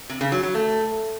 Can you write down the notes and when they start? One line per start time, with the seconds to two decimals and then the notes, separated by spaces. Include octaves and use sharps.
0.10 C3
0.21 C#3
0.32 F#3
0.43 F#3
0.55 A3